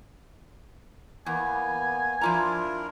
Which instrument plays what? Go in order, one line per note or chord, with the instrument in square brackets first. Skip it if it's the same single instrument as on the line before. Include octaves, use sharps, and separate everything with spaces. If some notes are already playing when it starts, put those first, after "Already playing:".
[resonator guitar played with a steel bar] E2 [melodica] A#3 B3 [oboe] G#5
[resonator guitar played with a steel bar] F3 F4 A#5 [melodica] D4 E4 A#4